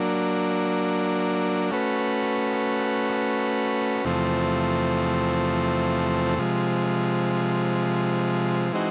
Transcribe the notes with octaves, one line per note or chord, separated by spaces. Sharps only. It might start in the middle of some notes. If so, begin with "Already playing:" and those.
Already playing: F#3 A#3 D4
A3 C#4 F#4 B4
E2 C3 F3 A3 C4
C3 F3 G#3
E3 G#3 C4 D#4 F#4